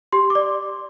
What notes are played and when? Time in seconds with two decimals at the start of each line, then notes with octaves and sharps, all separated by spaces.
0.12 G4 C6
0.30 D6
0.35 D5